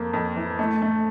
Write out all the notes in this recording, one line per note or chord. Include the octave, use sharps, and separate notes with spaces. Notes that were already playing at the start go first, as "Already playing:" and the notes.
Already playing: F2 A#3
F2
E3
A3
A3